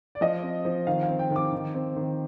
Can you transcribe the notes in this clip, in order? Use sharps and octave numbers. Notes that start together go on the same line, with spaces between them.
D5
F3 D#5
C4
F3
D#3 F5
F5
C4
G5
D#3
D6
D#3
C4
D#3